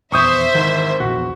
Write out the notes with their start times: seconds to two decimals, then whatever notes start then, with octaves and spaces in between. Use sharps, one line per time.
0.12 D#1 E2 C5 E5 C#6 D#6 G6
0.55 G#1 D#3 E3
1.00 A#1 E2 F#4